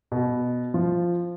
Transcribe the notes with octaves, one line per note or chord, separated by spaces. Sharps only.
B2
F3